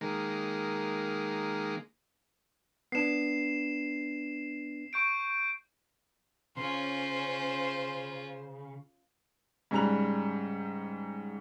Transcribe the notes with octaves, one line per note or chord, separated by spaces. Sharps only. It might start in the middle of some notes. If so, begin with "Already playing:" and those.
D#3 G#3 A#3
B3 D4 C7 E7
C#6 G6 D7
C#3 C#4 F4 C5 C6
G#2 C#3 G3 A#5 F#6 F7